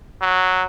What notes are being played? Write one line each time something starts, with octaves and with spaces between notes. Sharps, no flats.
F#3